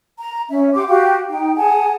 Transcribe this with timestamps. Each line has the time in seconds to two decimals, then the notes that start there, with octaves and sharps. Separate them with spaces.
0.19 A#5
0.50 C#4 E5
0.74 G4 F#5 C6 D6
0.89 F#4 G4 F5 G5
1.29 D#4 G5
1.56 G#4 F#5 G#5 A5